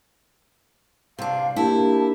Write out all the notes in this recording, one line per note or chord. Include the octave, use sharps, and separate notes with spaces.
C3 D4 F5
A#3 D4 E4 G4 A5